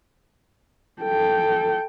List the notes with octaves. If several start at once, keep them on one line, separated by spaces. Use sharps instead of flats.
A4 G5